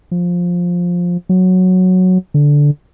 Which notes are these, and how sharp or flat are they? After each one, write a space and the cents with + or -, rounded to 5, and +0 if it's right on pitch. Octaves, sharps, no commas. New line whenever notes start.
F3 +10
F#3 -5
D3 -10